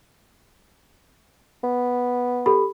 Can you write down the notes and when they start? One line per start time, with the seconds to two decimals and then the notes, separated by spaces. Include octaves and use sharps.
1.64 B3
2.46 G4 A4 B5